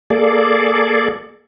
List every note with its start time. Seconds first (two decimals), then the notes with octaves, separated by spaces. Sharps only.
0.10 A#3 G#4 A4 D5